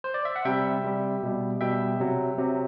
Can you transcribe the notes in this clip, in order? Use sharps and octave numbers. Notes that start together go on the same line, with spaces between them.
C5
D5
E5
F#5
C3 G3 E5 G5
C3 G3
B2 G3
B2 G3 E5 G5
C3 F#3
C3 F#3